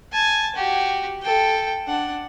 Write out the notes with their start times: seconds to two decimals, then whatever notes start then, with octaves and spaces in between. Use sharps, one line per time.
0.12 G#5 A5
0.55 F#4 G4
1.22 A4 G5
1.87 D4 F#5